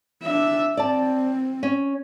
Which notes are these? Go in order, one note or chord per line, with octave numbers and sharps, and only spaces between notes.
D4 E5
C4 D5 A5
C#4